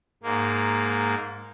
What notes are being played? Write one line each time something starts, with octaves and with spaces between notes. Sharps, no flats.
G#2 A#3